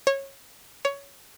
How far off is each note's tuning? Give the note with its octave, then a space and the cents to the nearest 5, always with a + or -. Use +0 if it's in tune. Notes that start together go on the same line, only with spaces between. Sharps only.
C#5 -20
C#5 +15